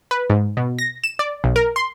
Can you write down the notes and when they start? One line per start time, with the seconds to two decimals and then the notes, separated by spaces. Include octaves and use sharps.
0.11 B4
0.30 G#2
0.57 B2
0.79 A#6
1.04 E7
1.19 D5
1.44 B1
1.56 A#4
1.76 C6